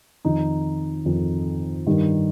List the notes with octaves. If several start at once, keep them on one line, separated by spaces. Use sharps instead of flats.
F2 D#3 D#4
F2 D#3
G2 D#3